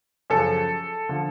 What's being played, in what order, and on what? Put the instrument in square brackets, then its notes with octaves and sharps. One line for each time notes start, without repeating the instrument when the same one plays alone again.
[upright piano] F#2 C#3 F3 A4
D3 F3